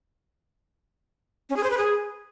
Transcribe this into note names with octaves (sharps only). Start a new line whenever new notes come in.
C#4
G#4
C5
B4
G#4